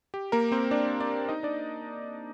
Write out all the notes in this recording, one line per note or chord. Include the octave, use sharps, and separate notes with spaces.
G4
A#3 A#4
C4 C5
D4 D5
D4 D5
D#4 D#5
D4 D5